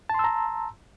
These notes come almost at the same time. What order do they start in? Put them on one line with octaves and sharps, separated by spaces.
A5 C6 E6 A#5